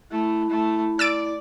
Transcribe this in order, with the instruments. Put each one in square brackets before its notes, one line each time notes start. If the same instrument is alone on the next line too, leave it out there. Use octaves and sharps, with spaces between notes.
[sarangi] A3 [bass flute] E4
[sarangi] A3
[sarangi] D5 [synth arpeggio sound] E6 A6 D7